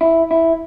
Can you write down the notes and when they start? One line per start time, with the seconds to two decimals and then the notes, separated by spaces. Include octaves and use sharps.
0.01 E4
0.31 E4